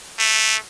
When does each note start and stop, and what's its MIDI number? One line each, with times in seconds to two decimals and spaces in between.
0.19 0.56 57